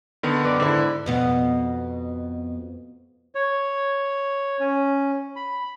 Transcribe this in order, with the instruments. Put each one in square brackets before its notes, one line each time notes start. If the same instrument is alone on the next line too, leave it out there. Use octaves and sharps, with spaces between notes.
[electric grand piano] D3 D#3 B3
[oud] F#2 B4 D5
[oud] G#2 E4 [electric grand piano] D3
[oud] F2 B2 B3
[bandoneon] C#5
C#4
B5